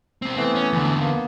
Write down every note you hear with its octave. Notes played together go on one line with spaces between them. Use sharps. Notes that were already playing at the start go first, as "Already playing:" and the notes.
C2 C4
E3 A3 B3 C4
C#4
E2 D3
A#3 B3